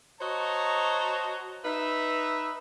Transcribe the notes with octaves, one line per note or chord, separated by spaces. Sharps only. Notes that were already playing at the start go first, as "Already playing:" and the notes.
F#4 C5 C#5 D#5 A5 A#5
D#4 B4 E5